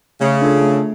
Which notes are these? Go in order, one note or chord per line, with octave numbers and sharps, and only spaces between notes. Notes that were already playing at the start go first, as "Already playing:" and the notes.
C#3 A3
D4 F4 A4
A3